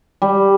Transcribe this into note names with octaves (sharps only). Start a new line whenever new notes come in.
G3